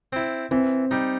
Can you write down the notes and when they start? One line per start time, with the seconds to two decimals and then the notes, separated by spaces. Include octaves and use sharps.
0.13 C4 E4
0.51 E3 C4
0.91 G3 D#4